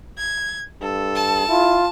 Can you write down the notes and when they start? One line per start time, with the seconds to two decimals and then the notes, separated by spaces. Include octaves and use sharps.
0.18 G#6
0.81 G2 A4
1.15 A5
1.49 E4 F4